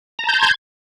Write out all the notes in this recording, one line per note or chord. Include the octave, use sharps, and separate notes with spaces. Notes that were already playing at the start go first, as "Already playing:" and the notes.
A5 A#5 C6 G6 G#6